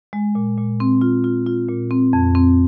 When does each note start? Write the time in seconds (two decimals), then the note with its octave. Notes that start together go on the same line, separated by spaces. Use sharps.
0.13 G#3
0.35 A#2
0.58 A#2
0.80 C4
1.01 F4
1.24 F4
1.46 F4
1.68 A#2
1.91 C4
2.13 F2
2.35 C4